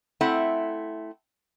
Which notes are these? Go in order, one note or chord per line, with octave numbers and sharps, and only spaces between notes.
A3 C4 E4 F#5